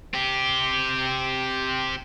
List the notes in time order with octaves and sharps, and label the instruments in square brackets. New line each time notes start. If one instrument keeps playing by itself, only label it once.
[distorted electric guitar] C4 G4